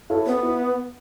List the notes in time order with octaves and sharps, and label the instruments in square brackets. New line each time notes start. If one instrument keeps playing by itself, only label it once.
[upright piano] E4 A4 C#5 F5
[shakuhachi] B3 [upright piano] C4
[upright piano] E4